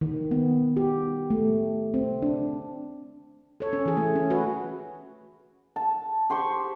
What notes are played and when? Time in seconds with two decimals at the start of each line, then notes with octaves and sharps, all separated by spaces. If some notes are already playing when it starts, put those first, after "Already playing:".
0.01 D#3
0.31 B3
0.77 G4
1.30 A3
1.94 C4
2.22 D4
3.60 A4 C#5
3.73 C#4
3.86 E3 G#4
3.97 A3
4.15 C#4
4.30 F#4 B4
5.76 A5
6.30 G4 C5 C6 C#6